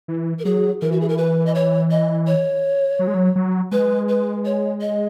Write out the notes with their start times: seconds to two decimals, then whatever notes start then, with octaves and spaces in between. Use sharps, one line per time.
0.08 E3
0.39 A#4
0.45 F#3 G#4
0.82 E3 A#4
0.92 F#4
1.01 G#4
1.09 A#4
1.18 B4
1.46 D#5
1.55 C#5
1.91 D#5
2.27 C#5
2.99 F#3
3.07 G#3
3.14 F#3
3.36 F#3
3.72 G#3 B4
4.09 B4
4.45 C#5
4.81 D#5